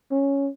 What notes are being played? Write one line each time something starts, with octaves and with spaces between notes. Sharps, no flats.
C#4